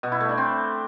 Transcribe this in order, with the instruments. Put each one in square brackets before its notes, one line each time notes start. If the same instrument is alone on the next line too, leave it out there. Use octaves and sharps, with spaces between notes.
[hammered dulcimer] B2
E4
A3
D4
C4